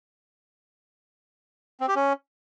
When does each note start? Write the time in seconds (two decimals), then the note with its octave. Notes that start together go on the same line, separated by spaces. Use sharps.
1.81 C4
1.88 G4
1.96 C#4